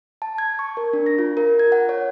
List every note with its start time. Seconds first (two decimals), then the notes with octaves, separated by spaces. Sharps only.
0.22 A5
0.38 G#6
0.59 C#6
0.77 A#4
0.93 D4
1.06 A#6
1.19 F4
1.37 A#4
1.59 G#6
1.72 F#5
1.89 C#5